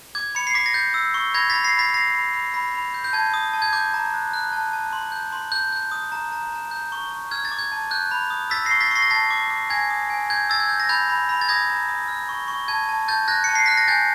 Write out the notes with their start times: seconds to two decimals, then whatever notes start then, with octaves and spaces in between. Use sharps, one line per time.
0.15 D6 G#6
0.35 B5 C#7
0.47 C7
0.54 D6 B6
0.66 A#6
0.74 G6 A6
0.94 E6
1.14 C#6
1.34 B5 G#6 A#6
1.50 A6 B6
1.54 B5
1.64 A#6 C7
1.74 B5 A6 B6
1.94 B5 A#6 C7
2.15 B5
2.33 B5
2.54 B5
2.74 B5
2.94 G6
3.04 G6
3.13 A5 G#6
3.34 D#6
3.53 A5
3.62 G#6
3.73 D6 G6
3.94 A#5
4.14 F#6
4.34 F#6
4.53 A5
4.73 A5
4.93 C6
5.12 G6
5.32 C6
5.52 G6
5.72 G6
5.92 D#6
6.12 A#5
6.33 A#5
6.52 A#5
6.71 G6
6.92 C#6
7.12 C#6
7.31 F6 G#6
7.45 A6
7.52 D6
7.59 G#6
7.72 A5
7.91 F#6 G6
8.11 B5
8.30 D#6
8.50 E6 A6 B6
8.65 A#6 C7
8.71 C#6
8.81 A6 B6
8.91 C#6 A#6 C7
9.02 A#6
9.10 A5 A6 B6
9.30 D6
9.51 D6
9.70 G#5 G#6 A#6
9.90 D#6
10.10 G#5
10.30 G6 G#6
10.50 E6 A6
10.60 G#6
10.69 G6
10.80 A#6
10.89 B5 G6 A6
11.10 B5
11.29 B5
11.41 A6
11.49 D#6 G#6 A#6
11.70 A#5
11.89 D#6
12.08 F6
12.29 C#6
12.48 C#6
12.68 A5 G#6
12.89 A5
13.08 A5 G6 A6
13.28 F#6 G#6 A#6
13.44 A5 C#7
13.55 C7
13.66 F#6 B6
13.77 A#6
13.88 G#5 G6 A6